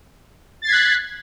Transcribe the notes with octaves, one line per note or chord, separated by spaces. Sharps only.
F#6 G#6 A6 B6 C7